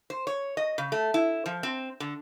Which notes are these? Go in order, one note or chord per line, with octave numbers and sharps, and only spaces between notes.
C5
C#5
D#5
C#3
A3
E4
F3
C4
D3